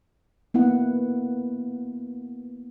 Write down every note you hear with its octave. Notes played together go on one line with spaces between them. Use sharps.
A#3 B3 E4 F#5